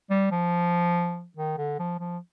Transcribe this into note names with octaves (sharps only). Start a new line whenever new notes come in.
G3
F3
D#3
D3
F3
F3